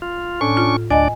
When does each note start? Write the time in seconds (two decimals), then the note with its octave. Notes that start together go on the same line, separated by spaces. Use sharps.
0.02 F4
0.41 A2 C#4 D4 C#6
0.57 F4
0.90 D2 D4 D5 D#5 G#5